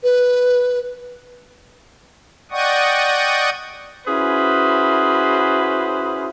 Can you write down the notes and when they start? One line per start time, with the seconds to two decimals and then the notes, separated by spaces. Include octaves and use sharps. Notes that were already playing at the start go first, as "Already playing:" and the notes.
0.03 B4
2.51 D5 D#5 F#5 G5 C#6 D#6
4.07 C#4 E4 F#4 G#4 B4 C5